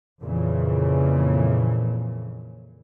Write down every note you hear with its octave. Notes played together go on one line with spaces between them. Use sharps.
F2 A#2 C#3 E3